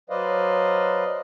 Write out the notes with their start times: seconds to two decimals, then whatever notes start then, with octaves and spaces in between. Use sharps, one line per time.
0.10 F#3 B4 C5 D5 D#5 F5